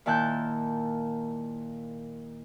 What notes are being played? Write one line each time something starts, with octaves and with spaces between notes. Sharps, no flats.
A#2 D#3 E4 A5 F#6 G6